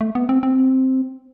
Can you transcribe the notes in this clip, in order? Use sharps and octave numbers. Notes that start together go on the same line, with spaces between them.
A3
B3
C4
C4